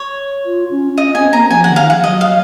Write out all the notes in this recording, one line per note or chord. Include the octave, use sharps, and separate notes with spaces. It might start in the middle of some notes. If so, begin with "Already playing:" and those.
Already playing: C#5
F4
C#4
C#4 D#5
C4 G#5
A#3 A#5
F3 G#5
D#3 F#5
F5
F3 F#5
F#3 D#5
F5